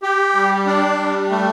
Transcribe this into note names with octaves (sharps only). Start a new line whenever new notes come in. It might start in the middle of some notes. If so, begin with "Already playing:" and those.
G4
G3
D4
G3
A3